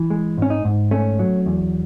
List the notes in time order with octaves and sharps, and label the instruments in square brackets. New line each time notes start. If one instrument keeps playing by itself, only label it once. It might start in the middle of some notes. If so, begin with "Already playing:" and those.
Already playing: [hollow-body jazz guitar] E3
G#3
G#2 C#4
D#4
G#2
A3 C#4
F#3
E2